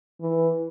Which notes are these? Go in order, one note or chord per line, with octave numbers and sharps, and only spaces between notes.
E3